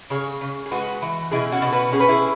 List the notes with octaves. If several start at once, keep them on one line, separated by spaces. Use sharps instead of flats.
C#3 G#4 C#5
C#3
G#4
G#3 F#4 B4
E3
B2 E4 G#4
C#4 F#4
B2
F#4 B4
C#4 G#4
B4
E4 G#4